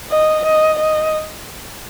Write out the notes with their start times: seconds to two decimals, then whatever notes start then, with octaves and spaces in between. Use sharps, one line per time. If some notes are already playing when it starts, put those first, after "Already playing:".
0.11 D#5
0.45 D#5
0.79 D#5